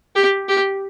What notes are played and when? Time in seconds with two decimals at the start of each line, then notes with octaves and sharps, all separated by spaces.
0.15 G4
0.48 G4